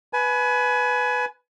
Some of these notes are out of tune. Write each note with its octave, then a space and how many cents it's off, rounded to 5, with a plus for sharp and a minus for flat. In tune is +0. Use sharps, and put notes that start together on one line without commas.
B4 +0 G#5 +30